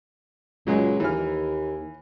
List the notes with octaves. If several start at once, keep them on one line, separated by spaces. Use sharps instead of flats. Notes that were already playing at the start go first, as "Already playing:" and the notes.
C#2 A#2 F#3 G#3
D#2 E3 F6